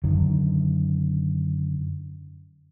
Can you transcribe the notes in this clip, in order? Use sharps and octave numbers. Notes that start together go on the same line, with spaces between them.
F#2 D3 D#3